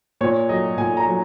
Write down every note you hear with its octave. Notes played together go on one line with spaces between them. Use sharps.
A#2 C#5
F#3 D#5
A#2 G#5
A#5
F#3